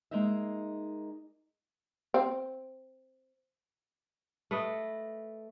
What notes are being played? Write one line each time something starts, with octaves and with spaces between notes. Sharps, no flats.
G#3 A#3 D#4 D#5 E5
C4
A3 B4 D#5